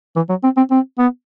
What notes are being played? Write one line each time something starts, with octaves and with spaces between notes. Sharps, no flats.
E3
F#3
C4
C4
C4
B3